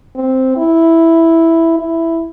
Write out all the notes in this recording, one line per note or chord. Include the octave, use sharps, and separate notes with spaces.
C4
E4
E4